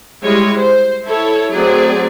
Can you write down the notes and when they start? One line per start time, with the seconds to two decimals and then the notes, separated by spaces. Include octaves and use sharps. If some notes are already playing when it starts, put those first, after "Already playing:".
0.23 G3 G#3 E4 C#5
0.57 C5
1.07 E4 A4 C#5
1.52 F#3 A3 C4 G#4 D5